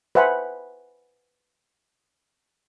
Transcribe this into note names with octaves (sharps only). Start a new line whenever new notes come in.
B4 C5 E5 F#5 G#5 B5